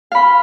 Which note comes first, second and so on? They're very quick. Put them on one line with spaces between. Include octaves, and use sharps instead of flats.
F5 B5 C6